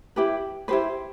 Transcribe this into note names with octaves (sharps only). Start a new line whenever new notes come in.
E4 G4 B4
E4 G4 B4 C5